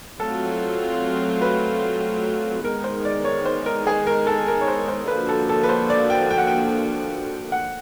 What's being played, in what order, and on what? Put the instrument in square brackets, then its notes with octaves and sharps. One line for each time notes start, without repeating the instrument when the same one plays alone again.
[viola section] F#3 A3 C4 F4 [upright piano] A4
[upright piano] B4
[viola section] D#3 G#3 B3 D#4 [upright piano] A#4
[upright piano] C5
D5
C#5
C5
A#4
G#4
A#4
A4
A#4
C#5
C5
C5
[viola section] D3 F3 A#3 D4 F#4 [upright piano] B4
[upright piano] A4
A4
B4
C5
D5
G5
G5
F#5
G5
F#5